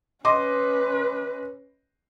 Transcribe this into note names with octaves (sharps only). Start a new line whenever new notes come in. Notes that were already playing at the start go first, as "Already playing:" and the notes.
C#4 B4 D#5 C6 D6